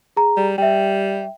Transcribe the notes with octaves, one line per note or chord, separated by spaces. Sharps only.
G#4 A#5
G3
G3 E5 G5